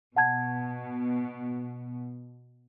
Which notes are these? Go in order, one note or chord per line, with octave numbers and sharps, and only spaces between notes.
B2 F#5 A5 G#6